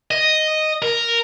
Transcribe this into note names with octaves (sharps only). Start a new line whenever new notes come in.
D#5
A#4